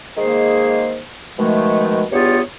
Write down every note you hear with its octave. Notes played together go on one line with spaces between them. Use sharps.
D#3 G#3 A#3 G#4 C5
B2 D#3 F3 G#3 A3
E2 G2 B3 F4 G4 C#5